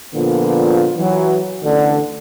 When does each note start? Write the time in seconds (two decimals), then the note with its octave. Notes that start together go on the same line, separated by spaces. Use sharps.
0.14 A#2 D3 F3 B3 F4
0.96 E3 F#3
1.63 A1 D3